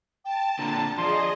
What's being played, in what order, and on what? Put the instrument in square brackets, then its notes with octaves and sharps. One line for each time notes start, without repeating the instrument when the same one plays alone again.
[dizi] G5 [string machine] A5
[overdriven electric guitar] A#2 D3 [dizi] A#5
[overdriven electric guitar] F3 [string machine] G#4 D#5 [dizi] D5 [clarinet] C6